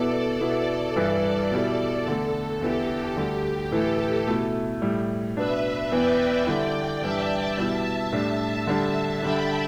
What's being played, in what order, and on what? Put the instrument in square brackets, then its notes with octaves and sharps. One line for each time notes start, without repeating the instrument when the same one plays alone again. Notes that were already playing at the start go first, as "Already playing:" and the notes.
Already playing: [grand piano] B2 B3 E4 [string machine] A4 D5
[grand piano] B2 B3 E4
[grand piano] G2 E3 G3 E4 [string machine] A4 D5
[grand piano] B2 G3 E4 [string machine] A4
[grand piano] E2 D3 A3
[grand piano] E2 D3 B3 E4 [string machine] G4
[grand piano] D2 D3 G3 [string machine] G4
[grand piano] A2 E3 A3 E4 [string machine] A4
[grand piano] B2 A3 E4
A2 G3 E4
[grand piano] B2 B3 D4 [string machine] B4 E5
[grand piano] E2 E3 B3 [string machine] D5 G5
[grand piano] D3 G3 E4
[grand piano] G2 E3 G3 D4 [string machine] E5 A5
[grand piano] B2 G3 B3 E4 [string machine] E5 A5
[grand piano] A2 G3 D4
D3 G3 D4
[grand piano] D3 G3 D4 [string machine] G5 B5